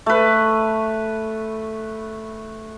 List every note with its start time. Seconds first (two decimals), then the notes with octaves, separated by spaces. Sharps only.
0.06 A3 B4